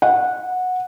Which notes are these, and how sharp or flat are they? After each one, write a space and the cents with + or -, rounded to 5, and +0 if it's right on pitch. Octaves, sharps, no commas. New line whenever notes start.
F#5 -15